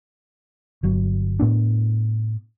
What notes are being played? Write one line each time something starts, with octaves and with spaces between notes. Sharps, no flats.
G1 F#3
A2 B3 D4